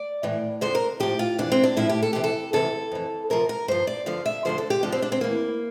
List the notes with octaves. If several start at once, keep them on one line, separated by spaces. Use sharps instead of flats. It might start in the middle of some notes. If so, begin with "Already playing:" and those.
Already playing: D5
A2 E3
F2 D3 F3 C5
A#4
A2 F3 G4
F4
F2 E3 D4
C4
D4
A2 F3 E4
G4
A4
D2 C3 E3 G4
A4
D2 C3 E3 A4
F2 E3
D2 C3 F3 A#4
A#4
G2 F3 C5
D5
G2 D3 F3 F5
E5
D2 D3 F3 C5
A4
G4
D2 D3 F3 D4
C4
D4
C4
E2 E3 A#3